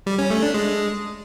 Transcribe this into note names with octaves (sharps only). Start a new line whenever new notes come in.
G3
C#4
A3
D4
G#3